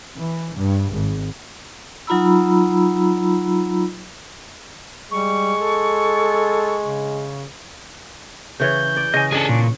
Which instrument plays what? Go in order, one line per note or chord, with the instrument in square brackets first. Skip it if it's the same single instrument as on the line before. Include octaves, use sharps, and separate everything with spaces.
[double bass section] E3
G2
G#1
[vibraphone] F#3 D#4 F4 A#5 B5 E6
[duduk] G3 [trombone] G#3 [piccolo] C#6
[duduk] A4
C#3
[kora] C#3 E3 C#5 [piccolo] G6
[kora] D5
[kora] C#3 [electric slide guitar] D#5 G#5
[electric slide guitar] C#4 D4 [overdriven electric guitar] G#4 A4 [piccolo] D#5
[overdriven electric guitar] A#2 [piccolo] C#6